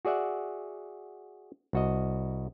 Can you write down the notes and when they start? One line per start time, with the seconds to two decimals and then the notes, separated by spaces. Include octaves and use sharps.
0.05 F#4 G#4 D5 E5 F#5
1.73 C2 F#4 D#5